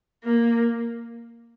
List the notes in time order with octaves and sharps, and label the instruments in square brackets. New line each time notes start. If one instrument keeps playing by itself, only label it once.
[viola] A#3